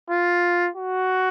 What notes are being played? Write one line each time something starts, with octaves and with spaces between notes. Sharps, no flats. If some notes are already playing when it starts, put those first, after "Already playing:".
F4
F#4